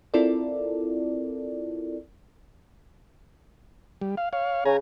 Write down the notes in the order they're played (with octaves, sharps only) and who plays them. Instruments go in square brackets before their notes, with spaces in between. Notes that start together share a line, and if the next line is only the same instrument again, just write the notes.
[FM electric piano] C4 E4 F4 A4 A#4 D5
[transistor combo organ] G3
F5
C#5 F5
[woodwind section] C#3 [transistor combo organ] G#5 A#5